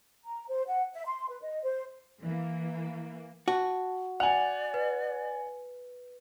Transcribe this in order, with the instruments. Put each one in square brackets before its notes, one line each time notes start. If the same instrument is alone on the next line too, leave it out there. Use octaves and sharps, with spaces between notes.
[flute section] A#5
C5
F#5
E5
C6
B4
D#5
C5
[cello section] E3 A#3
[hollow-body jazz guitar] F#4 [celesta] A5
[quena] D5 [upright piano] F#5 G#5 [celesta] F7
[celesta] B4